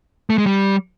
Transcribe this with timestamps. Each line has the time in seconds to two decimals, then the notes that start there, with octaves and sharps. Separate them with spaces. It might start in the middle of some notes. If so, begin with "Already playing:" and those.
0.30 A3
0.38 G#3
0.46 G3